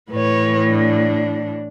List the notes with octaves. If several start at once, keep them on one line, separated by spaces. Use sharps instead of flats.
A2 E3 B4 C#5
D4